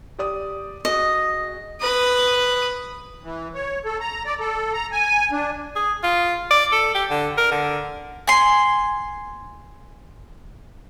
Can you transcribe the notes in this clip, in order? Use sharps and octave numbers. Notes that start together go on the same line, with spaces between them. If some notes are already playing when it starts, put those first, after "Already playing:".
G4 D5 D#6
F#4 G#4 D#5
B4 D#6
E3
C#5
A4
A#5
D5
A4
A#5
G#5
D4
G#4
F4
D5
A4
G4
D3
A#4
D3
G#5 C6